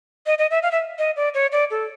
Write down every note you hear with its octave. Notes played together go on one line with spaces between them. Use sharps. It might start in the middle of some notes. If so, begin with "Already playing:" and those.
D#5
D#5
E5
F5
E5
D#5
D5
C#5
D5
A4